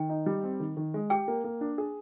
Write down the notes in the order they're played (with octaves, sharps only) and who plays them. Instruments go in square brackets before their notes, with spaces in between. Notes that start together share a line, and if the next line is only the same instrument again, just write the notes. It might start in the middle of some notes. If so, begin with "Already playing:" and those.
Already playing: [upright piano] D#3 [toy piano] G5
[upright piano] D#4
G3
C4
D#3
D#3
G#3
[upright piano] G4 [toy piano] G5
[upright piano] A#3
A#3
D4
G#4